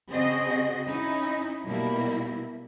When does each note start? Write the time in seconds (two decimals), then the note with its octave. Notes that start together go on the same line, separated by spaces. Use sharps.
0.11 C#3 C4 F#4 G#4 D#5
0.85 C#4 D#4 E4
1.64 B2 G3 A#3 E4